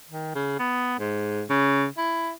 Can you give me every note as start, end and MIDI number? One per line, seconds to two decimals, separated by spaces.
0.10 0.30 51
0.35 0.56 49
0.59 0.99 59
1.00 1.43 44
1.50 1.86 49
1.98 2.32 64